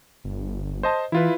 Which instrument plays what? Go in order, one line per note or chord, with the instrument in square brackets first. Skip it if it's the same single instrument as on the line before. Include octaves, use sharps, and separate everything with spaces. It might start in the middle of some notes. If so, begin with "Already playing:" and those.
[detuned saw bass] G1
[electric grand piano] C5 D#5 A5
[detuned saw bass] E3 [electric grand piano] E4 F4 B4